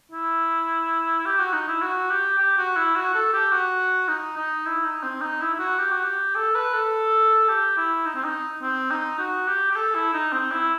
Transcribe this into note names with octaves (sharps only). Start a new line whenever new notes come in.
E4
G4
F#4
D#4
E4
F#4
G4
G4
F#4
E4
F#4
A4
G4
F#4
D#4
D#4
E4
D#4
C4
D#4
E4
E4
F#4
G4
F#4
G4
A4
B4
A4
G4
E4
D#4
C4
D#4
C4
D#4
F#4
G4
G4
A4
E4
D#4
C4
E4